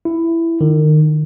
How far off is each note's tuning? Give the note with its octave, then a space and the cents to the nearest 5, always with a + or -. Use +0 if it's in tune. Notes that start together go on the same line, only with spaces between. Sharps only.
E4 +10
D#3 -30